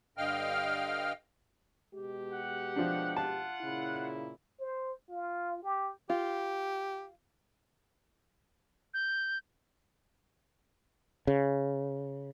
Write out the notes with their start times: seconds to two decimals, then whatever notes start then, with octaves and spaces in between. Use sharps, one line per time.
0.17 G2 D3 D#5 F5 G5 F6
1.93 B2 G#3 G4
2.31 F#5
2.76 F3 D4
3.17 F4 F#5 A5
3.62 A#2 C#3 E4
4.60 C5
5.09 F4
5.63 G4
6.10 F4 G4
8.94 G6
11.27 C#3